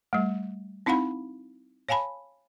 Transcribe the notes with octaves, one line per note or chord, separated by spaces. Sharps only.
G3 A3
C4 D#4 E4 F5 F#5 B5
C#5 F5 G#5 A5 B5